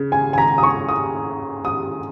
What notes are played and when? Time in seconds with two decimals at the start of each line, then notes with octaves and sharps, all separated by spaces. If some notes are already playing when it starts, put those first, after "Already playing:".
Already playing: C#3
0.12 G#5
0.33 G#5
0.38 A#5
0.58 D#6
0.63 C#6
0.89 D#6
1.65 D#6